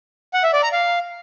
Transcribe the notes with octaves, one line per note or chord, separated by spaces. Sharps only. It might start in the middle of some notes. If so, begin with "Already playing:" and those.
F#5
E5
D5
A#5
F5